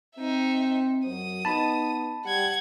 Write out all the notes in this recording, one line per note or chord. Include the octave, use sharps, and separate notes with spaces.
C4 D#4 E5
F#2 F#3 D#6
B3 D#4 A5 B5
G3 G4 F#5 G#6